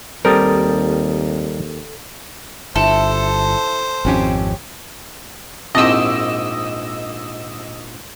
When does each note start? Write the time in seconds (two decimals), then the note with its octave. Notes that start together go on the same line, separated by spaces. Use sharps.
0.25 D#2 G3 C4 G4 A4 A#4 D#6 A6
2.76 G1 E4 A4 C5
4.05 G#1 F2 C4 C#4 G4
5.75 A#1 G#2 C4 E4 G4 D#5 E6